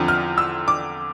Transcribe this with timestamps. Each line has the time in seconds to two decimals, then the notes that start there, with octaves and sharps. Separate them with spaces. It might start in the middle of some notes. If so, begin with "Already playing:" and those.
Already playing: E2 D3 F3 C4
0.08 F6
0.38 E6
0.68 D6